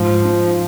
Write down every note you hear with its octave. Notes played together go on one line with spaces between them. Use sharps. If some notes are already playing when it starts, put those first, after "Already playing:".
Already playing: G#2 F3
D#4